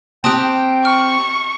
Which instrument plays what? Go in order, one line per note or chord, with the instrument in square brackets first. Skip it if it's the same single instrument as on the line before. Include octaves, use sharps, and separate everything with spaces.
[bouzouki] C4 G4 [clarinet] G5 [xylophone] A5 D#6 F#6
[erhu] C#6 [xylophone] F6